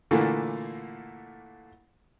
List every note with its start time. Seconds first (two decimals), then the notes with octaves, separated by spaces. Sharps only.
0.11 A#2 D3 E3 A3 A#3